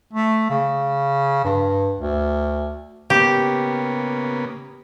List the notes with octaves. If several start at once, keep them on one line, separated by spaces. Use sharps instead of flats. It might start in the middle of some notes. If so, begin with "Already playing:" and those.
A3
C#3
G2
D2
C#3 A#3 B3 G4